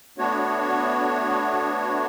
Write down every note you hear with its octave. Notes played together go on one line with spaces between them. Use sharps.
A3 B3 D4 F#4 C#5